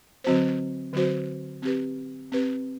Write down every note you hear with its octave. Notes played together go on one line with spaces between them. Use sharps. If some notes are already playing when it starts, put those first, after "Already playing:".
D3 F#3 C4 F#4 C5
D3 F#3 C4 F#4 C5
C4 G4 B4
C4 G4 B4